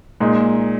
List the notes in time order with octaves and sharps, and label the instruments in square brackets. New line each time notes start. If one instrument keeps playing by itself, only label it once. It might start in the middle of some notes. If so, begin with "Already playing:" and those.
[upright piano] A#2 G#3 D#4